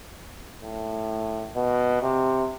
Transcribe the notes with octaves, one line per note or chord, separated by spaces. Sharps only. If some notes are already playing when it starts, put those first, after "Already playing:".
A2
B2
C3